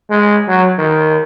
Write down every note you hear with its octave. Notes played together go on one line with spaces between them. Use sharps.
G#3
F#3
D#3